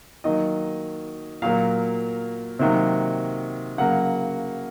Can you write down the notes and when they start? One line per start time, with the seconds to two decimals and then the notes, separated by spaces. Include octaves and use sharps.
0.24 D#3 F#3 A#3 D#5
1.42 A#2 F#3 A#3 F5
2.59 C3 D#3 F#3 A#3
3.78 C#3 F#3 A#3 F#5